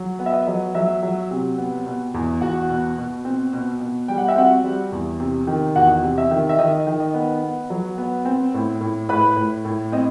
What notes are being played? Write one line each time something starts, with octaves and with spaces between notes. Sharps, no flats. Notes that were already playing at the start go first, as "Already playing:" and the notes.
Already playing: F#3
B3
E5
D#5
F#3
F#3 E5
F#3
C3
B3
B2
E2
E2 F#4 F#5
B2
B2
C4
B2
B2
G3 G5
F#5
E5
C4 F#4 F#5
G3
E2
C3
D#3
E2 F#4 F#5
C3
E5
D#3
E5
D#3 D#5
D#3
D#5
B3
B3
F#3
B3
C4
A2
A2
A2 B4 B5
A2
A2
C4 D#5